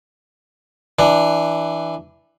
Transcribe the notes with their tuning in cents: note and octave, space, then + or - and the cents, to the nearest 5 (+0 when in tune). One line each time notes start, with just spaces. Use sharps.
E3 +0 D4 +10